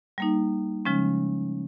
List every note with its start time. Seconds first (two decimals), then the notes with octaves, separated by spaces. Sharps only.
0.18 G3 A#3 D#4
0.85 C#3 F3 G#3 C#4